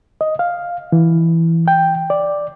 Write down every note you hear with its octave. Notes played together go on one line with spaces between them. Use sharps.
D#5
F5
E3
G5
D5